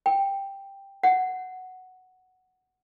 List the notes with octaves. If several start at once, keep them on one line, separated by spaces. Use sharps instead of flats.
G5
F#5